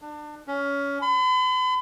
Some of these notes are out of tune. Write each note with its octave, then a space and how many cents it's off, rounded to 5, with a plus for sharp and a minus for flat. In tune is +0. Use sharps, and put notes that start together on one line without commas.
D4 +30
C#4 +20
B5 +45